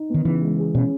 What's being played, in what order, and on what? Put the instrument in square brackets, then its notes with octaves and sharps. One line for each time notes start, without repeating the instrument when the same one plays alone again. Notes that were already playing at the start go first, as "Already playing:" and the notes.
Already playing: [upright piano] D#4
[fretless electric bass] D#3 [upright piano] B3
[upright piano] C#3 [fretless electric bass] E3
[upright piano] G#3
G#4
[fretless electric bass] B2 [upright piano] C#4